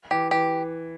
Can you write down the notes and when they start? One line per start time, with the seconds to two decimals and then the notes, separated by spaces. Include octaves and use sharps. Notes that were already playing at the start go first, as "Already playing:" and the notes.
0.11 E3 G4
0.31 E3 G4